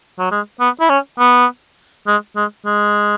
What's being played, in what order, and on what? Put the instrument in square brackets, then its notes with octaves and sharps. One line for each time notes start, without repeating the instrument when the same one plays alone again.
[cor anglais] F#3
G#3
B3
E4
C#4
B3
G#3
G#3
G#3